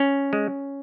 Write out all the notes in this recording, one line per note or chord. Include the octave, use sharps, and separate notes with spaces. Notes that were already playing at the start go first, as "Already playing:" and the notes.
Already playing: C#4
G#3